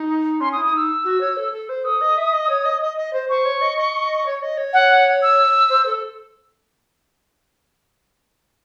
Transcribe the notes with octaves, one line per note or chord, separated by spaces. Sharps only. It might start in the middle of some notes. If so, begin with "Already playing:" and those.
Already playing: D#4
C#4 C6
D#6
E4
D#6
D#4 E6
F#4
C#5
A4
A4
C5
A4 D#6
D#5
E5
D#5
C#5
D#5
D#5
D#5
C5
C5 C#6
C#5
D#5
D#5
C#5
D#5
C#5
F#5
E6
C5
A4